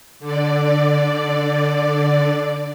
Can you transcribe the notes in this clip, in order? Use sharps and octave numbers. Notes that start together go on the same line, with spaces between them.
D3 D5